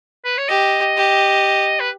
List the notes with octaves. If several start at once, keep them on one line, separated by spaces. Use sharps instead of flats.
B4
C#5
G4 D#5
G4
B4